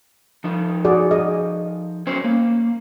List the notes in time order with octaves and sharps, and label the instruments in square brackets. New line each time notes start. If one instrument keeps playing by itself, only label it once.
[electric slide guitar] F3 D#4
[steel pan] F#4 G#4 D5
G#4 D#5
[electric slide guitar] F#3 C#4 C5
A#3